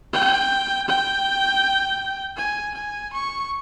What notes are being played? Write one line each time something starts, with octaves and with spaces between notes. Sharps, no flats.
G5
G5
G#5
G#5
C#6